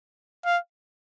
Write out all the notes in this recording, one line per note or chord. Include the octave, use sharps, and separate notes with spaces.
F5